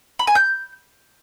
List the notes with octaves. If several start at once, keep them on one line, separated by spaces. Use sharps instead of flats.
B5
G#5
G6